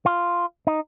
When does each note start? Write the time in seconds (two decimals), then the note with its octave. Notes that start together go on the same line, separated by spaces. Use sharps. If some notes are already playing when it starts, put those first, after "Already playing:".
0.06 F4
0.67 D#4